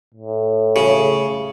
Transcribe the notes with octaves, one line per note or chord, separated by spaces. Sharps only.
A2
C#3 G#4 C#5